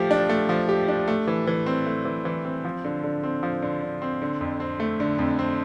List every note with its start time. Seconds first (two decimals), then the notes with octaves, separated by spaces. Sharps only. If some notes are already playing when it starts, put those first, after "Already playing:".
Already playing: F3 A3 G4
0.11 D4
0.29 A3
0.49 F3
0.69 G4
0.88 D4
1.08 A3
1.27 E3
1.47 E3
1.66 C4
1.86 A3
2.05 E3
2.25 E3
2.45 C4
2.65 F3
2.84 D3
3.03 D3
3.23 C4
3.43 F3
3.62 D3
3.82 D3
4.02 C4
4.22 D3
4.41 F2
4.60 C4
4.80 A3
5.00 D3
5.19 F2
5.39 C4